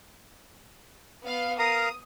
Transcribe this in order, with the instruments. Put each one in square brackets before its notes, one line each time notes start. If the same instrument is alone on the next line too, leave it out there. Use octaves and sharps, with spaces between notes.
[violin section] B3 F5
[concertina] A#4 F5 A#5 [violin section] D#6